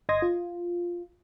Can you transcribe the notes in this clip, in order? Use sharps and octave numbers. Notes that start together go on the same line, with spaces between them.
G1 D#5 C6 D#6 G#6 A#6
F4